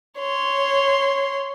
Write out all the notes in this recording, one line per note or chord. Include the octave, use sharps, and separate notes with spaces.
C#5 C6